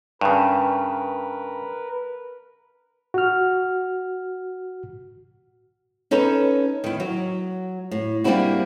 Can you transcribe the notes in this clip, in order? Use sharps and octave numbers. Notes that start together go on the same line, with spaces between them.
G2 C#3 A#4 B4
F#4 F6
C#4 D#4 A4 B4 C#5
D#3 E4
F#3
A2
G3 A#3 C4 D4 E4 F#4